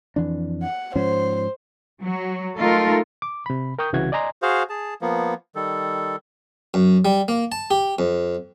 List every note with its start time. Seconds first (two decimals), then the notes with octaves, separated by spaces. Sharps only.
0.16 F2 E3 D4
0.63 F#5
0.95 G#2 F3 C#4 C5
2.01 F#3
2.58 A3 D#4 F4 A4 A#4
3.22 D6
3.46 C3 B5
3.79 A#4 G5 C#6 D#6 G6
3.93 C2 C#3 E3 F#4 G#6
4.12 D5 D#5 G#5 A#5 C6
4.42 F#4 G#4 C5 F5
4.69 G#4 A5
5.01 F3 A#3 B3
5.55 D#3 G3 A4
6.74 F#2
7.05 G3
7.28 A#3
7.52 A5
7.71 G4
7.99 F2